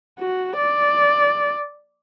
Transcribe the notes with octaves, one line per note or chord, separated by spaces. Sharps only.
F#4
D5